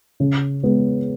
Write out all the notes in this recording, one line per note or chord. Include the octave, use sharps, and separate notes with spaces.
C#3
G#3 B3